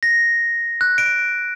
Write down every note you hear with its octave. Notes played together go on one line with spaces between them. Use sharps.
A#6
F#6
D7